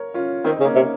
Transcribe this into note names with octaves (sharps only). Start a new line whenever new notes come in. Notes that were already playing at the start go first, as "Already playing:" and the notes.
Already playing: A#4 C#5
C#4 F4
D#3 C4 D#4
D#4
C#3
A#3 C#4
C3